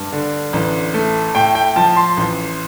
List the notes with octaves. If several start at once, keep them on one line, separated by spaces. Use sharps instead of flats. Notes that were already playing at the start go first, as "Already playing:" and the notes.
Already playing: G2
D3
A1
A3
A2 G5
G5
F3 A5
C6
A1